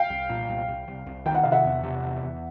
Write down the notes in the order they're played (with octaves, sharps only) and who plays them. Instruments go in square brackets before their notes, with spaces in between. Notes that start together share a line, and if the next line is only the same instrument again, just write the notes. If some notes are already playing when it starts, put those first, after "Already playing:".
Already playing: [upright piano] F5 G5
[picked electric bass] C2
A#2
C2
C2
C2
C2
[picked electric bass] D#3 [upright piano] G5
[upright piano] F#5
[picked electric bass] C3 [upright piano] F5
[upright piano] E5 F#5
[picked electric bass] E2
C3
E2
E2